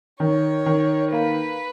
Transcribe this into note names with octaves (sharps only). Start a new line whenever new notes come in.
D#3 C#5
D#3
A#3 B4